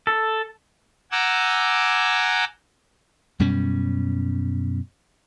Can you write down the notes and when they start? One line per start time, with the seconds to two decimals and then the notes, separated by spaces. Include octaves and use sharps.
0.07 A4
1.12 F#5 G#5 A#5 D6 E6 G6
3.39 F#2 B2 G3 C#4